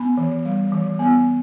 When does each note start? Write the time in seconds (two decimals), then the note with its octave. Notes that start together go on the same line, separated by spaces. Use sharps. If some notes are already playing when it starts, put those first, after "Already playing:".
Already playing: B3 B5
0.17 E3
0.45 G3
0.72 E3
0.99 B3